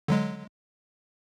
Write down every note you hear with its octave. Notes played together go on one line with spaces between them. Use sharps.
D3 F#3 G#3